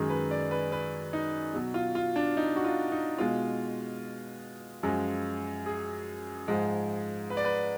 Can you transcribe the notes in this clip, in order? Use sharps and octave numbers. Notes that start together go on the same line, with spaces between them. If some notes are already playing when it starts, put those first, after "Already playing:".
Already playing: F#2 D#3 G#3 G#4
B4
D5
B4
B4
D#4
B2 F#3
F4
F4
D4
D#4
F#4
F4
D#4
B2 G#3 F4
F#2 F3 G#3
G#4
G#2 F3 G#3
B4
D5
B4